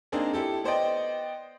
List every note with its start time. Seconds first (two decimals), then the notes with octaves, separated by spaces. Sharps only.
0.12 A#3 C4 D4 D#4 G#4 A#4
0.33 E4 G4 A4
0.64 B3 C5 D5 D#5 G5